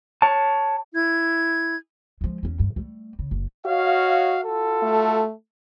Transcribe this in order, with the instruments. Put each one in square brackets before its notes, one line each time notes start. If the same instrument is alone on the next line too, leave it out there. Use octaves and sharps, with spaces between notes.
[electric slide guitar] C#5 A5
[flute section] E4 G#6
[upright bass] F3 G#3
E2 C#4
G2
G3 A3
C#3
F#1
[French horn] F#4 [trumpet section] C#5 D#5 F5
[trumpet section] F4 F#4 A4
[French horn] A3